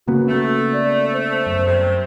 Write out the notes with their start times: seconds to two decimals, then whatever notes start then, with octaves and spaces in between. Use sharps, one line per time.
0.08 C#3 A#3 B3 F#4
0.28 A3 A4
0.73 D5
1.13 C5
1.46 F#2
1.65 C3 G3 C4